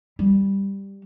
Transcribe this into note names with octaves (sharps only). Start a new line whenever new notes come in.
G3